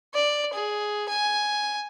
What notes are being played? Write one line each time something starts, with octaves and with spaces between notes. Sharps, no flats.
D5
G#4
G#5